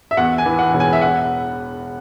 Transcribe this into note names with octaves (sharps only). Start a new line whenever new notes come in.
E5
E2 F#5
G#5
E3
F#5
E1
G#5
E5
F#5